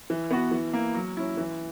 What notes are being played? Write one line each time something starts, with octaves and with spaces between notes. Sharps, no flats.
E3
B3 F#4
E3
A#3 E4
F#3
C#4 E4
E3